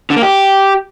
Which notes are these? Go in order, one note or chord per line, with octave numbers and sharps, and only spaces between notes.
D3
A#3
G4